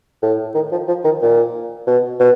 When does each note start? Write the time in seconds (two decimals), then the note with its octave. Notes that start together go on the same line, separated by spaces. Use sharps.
0.22 A2
0.55 D#3
0.72 F3
0.88 F3
1.05 D#3
1.22 A#2
1.87 B2
2.20 B2